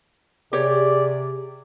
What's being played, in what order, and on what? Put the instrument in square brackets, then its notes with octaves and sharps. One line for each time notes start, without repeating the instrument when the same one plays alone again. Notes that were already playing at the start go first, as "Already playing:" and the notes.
[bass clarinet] C3 [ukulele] G4 C#5 [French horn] G#4 [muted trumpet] D5